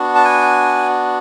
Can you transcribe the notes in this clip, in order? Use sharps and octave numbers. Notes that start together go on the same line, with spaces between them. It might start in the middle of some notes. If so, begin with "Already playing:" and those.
Already playing: B3 D4 F#4
A5
G#5